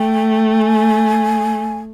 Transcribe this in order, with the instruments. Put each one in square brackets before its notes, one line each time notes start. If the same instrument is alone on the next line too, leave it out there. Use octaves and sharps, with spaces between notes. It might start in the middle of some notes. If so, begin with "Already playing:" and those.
Already playing: [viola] A3 [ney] G5
[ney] G#5